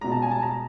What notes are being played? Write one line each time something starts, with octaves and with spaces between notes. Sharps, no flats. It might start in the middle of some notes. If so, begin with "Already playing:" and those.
B2 G#3 A#5
A5
G#5
A5
A#5